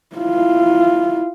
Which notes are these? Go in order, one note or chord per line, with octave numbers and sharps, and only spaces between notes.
E4 F4